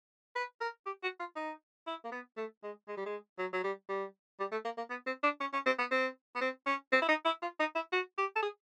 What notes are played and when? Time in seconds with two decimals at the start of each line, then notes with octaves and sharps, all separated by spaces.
0.36 B4
0.61 A#4
0.86 G4
1.03 F#4
1.20 F4
1.36 D#4
1.87 E4
2.05 A#3
2.12 B3
2.37 A3
2.63 G#3
2.88 G#3
2.97 G3
3.06 G#3
3.38 F#3
3.53 F#3
3.64 G3
3.89 G3
4.40 G3
4.52 A3
4.65 A#3
4.77 A#3
4.90 B3
5.07 C4
5.23 D4
5.40 C#4
5.53 C#4
5.66 C4
5.79 B3
5.91 C4
6.36 B3
6.41 C4
6.67 C#4
6.92 C4
7.02 E4
7.09 D#4
7.25 E4
7.42 F4
7.60 D#4
7.75 E4
7.93 F#4
8.18 G4
8.36 A4
8.43 G#4